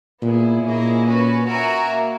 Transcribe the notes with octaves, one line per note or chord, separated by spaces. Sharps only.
A#2 B3 E4 G#4
A#2 A#3 C#4 E4 G#4 D#5
C#4 F#4 B4
F#4 A#4 E5 G#5
A#3